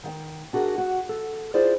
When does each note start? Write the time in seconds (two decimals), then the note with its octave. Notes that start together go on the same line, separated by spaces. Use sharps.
0.04 D#3 F#5 G5
0.53 D4 F#4 G#4 A#4
0.78 F#4
1.09 A4
1.54 E4 F4 G#4 C5 D5